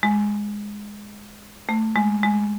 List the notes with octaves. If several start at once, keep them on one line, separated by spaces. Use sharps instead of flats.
G#3
A3
G#3
G#3